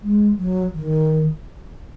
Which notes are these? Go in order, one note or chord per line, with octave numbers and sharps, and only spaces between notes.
G#3
F#3
D#3